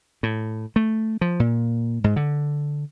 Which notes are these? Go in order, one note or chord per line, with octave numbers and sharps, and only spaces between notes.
A2
A3
F3
A#2
G#2
D3